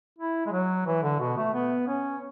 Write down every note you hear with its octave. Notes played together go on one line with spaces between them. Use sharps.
E4
G#3
F#3
E3
D3
B2
A3
B3
C#4